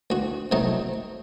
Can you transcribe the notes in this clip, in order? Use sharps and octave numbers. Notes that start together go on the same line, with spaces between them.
D2 F#4
C3 F#3 A3 D#4